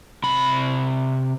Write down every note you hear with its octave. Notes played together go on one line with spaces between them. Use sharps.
C3 B5